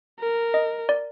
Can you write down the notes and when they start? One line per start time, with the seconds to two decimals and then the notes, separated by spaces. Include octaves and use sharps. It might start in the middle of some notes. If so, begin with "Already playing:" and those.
0.20 A#4
0.54 D#5
0.89 D5